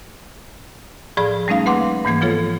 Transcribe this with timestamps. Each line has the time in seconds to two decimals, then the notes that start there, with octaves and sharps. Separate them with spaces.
1.17 A2 F3 G#4 D5 B5
1.48 G3 A3 C#4 D#4 F5
1.66 A#3 B4 F#5 C6 D6
2.05 G#2 E3 A#3 G#6
2.21 F3 B3 F4 A4 C#5